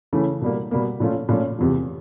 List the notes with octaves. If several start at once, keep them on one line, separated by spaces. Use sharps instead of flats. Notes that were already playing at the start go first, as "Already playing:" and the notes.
C#3 E3 A3 C#4
B2 G3 A#3
B2 G3 A#3
A#2 F3 A3 C#4 F4
A#2 F3 A3 C#4 F4
E2 C3 F3